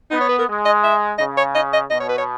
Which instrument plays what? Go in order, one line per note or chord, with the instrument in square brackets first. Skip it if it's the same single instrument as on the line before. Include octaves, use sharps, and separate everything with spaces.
[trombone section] B3 [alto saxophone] D#4
[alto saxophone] C#5
B4
A#4
[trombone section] G#3
[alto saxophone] D#5
E5
[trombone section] C#3 [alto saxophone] D#5
[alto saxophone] C#5
D#5
D#5
[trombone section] B2 [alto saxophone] D#5
[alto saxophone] C#5
B4
C#5